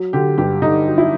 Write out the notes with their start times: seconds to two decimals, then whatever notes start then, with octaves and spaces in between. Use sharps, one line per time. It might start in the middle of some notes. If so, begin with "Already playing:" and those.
Already playing: F#3
0.13 D3 G4
0.38 G2 G4
0.62 D3 D#4
0.86 F#3
0.98 E4